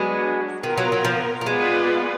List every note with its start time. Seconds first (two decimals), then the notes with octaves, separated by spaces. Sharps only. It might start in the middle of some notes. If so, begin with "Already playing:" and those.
Already playing: F#3 G#3 B3 D4 F#4
0.63 D#3 B3 F4 A#4
0.78 F#3
0.92 F#3
1.05 F3
1.41 A#3
1.46 G#3 B3 F4 G#4 B4 D5